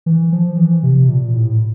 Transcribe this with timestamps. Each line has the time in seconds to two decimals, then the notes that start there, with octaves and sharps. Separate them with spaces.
0.06 E3
0.32 F3
0.57 E3
0.83 C3
1.09 A#2
1.34 A2